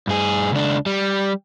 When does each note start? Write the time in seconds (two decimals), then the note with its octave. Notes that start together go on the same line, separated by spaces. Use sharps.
0.07 G2 G#4
0.52 C#2 D4
0.86 G3